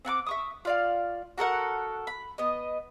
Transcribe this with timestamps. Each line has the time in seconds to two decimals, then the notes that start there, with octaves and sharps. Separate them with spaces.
0.05 C4 F#5 G#5 D6
0.27 E5 C#6 D#6
0.65 F4 D5 F5
1.38 F#4 A4 A#4 F#5
2.07 B5
2.38 B3 D#5